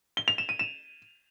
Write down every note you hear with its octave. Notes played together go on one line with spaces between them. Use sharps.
G7
F7
E7
D#7
E7